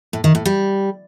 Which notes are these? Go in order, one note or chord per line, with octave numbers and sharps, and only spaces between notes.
A2
D#3
A2
G3